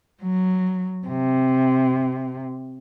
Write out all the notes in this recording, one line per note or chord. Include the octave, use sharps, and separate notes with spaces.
F#3
C3